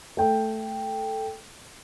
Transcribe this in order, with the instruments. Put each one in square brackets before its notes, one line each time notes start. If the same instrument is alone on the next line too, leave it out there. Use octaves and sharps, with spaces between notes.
[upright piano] A3 G5